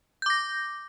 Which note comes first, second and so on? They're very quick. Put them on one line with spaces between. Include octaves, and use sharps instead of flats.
G6 D6 A#6